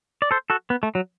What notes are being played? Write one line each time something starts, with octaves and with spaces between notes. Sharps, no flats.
D5
A4 C5
F#4 A4
B3
A3
F#3